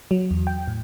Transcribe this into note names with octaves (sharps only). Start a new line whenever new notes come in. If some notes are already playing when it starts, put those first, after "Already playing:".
F#3
E2
G5
A2